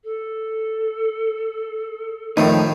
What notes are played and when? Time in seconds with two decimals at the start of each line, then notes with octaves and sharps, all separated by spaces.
0.04 A4
2.37 A2 D#3 F3 A3 D#4